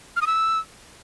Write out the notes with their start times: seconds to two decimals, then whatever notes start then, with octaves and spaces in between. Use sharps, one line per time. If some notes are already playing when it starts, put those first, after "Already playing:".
0.16 F6
0.21 D#6
0.27 E6